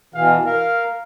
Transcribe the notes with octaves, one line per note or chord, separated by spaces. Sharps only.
B2 E3 F5
A#4 F5